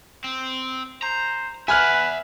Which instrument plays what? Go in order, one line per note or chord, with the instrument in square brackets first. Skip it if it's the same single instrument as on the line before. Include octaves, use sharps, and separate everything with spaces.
[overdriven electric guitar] C4
[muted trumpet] C5 [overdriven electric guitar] A#5
[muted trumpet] B4 [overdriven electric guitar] E5 F#5 [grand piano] G#5 F6 F#6